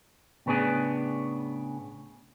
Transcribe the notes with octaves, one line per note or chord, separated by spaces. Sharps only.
A2 C#3 B3 D4 G#4